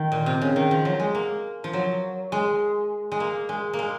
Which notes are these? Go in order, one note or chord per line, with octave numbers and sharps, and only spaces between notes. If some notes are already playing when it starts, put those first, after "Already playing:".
Already playing: D#3
A#2
C3
C#3
D#3
F3
F#3
G#3
A#3
F3
F#3
G#3
G#3
A#3
G#3
A#3
G#3